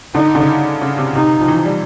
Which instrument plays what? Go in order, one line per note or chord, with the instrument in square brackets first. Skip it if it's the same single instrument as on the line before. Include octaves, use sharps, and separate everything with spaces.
[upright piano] D3 [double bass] D#4
[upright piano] D3
C#3
C#3
C3
[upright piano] C3 [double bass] D#4
[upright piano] F3
E3
F3
G3